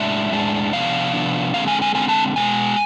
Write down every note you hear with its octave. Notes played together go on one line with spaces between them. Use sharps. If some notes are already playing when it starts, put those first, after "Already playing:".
Already playing: A2 G#3 D4 E5
A2 G#3 D4
C3 F3 B3 D4 F5
C3 F3 B3 D4
D3 G#3 C4 F5
G#5
G#5
D3 G#3 C4 G#5
A5
B2 G#3 B3 G#5